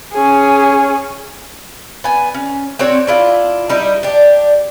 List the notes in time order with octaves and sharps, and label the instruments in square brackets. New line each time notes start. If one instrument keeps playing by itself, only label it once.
[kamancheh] C#4 G#4
[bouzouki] B3 G#5
C#4
C4 D4 F#4 C#5
D4 E4 F4
G3 D#4 E4
D4 G4